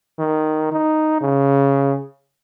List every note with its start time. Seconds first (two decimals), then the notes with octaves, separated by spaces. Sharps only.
0.19 D#3
0.72 D#4
1.21 C#3